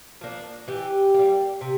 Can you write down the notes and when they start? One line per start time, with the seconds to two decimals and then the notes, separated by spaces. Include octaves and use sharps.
0.21 F3 A#3 D4
0.68 E3 G4
1.14 G3 A#3
1.61 C3